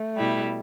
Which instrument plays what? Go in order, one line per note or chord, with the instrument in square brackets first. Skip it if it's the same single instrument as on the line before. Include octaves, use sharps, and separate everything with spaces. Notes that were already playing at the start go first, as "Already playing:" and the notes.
Already playing: [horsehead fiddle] A3
[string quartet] B2 G3 E4